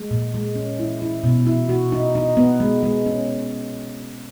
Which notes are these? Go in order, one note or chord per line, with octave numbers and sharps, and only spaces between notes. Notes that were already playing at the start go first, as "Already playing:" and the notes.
Already playing: G#3
A#2
G#3
C#4
E4
E4
B2
E4
F#4
D#4
D#4
B3
G#3
G#3
C#4